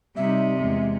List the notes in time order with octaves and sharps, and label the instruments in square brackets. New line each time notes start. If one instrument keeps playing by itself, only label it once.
[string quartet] C3 [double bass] G3 D#4 [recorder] E5
[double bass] E2 G#3